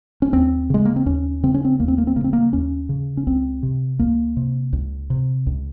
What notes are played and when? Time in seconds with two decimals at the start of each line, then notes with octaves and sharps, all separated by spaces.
0.22 C#4
0.33 D#2 C4
0.70 C#3 G#3
0.85 A#3
0.96 C4
1.06 D#2 C#4
1.43 C#3 C4
1.54 C#4
1.65 C4
1.80 D#2 A#3
1.88 C4
1.98 A#3
2.07 C4
2.16 C#3 A#3
2.24 C4
2.33 A#3
2.53 D#2 C#4
2.89 C#3
3.17 C#4
3.27 C#2 C4
3.63 C3
3.99 C#2 A#3
4.37 C3
4.73 C#2
5.10 C3
5.46 C#2